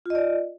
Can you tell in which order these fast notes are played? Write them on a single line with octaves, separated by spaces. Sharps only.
F4 D#5 D5